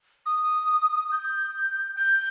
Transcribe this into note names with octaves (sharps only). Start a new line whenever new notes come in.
D#6
G6
G6